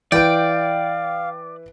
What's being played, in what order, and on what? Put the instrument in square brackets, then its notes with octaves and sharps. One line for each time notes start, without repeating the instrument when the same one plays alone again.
[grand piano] E3 B4 D7 [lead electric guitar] D5 [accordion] F5 [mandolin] G5